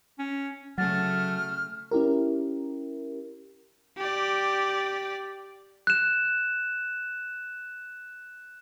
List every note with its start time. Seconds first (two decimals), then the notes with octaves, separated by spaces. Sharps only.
0.19 C#4
0.78 C#3 F#3 A3 F#5 F6 A6
1.91 C#4 E4 G4 A#4
3.97 G4 D5
5.87 F#6 E7